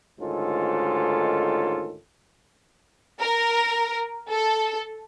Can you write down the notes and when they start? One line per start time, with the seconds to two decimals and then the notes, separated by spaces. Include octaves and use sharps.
0.19 D2 G#2 D#3 C#4 F4 A4
3.20 A#4
4.30 A4